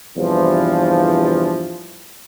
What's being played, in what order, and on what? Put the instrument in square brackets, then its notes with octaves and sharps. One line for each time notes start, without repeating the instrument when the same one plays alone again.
[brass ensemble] E2 G2 C3 E3 F3